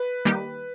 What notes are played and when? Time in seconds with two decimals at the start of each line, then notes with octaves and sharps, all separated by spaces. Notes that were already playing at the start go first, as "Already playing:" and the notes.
Already playing: B4
0.25 D#3 G3 A#3 D#4 G4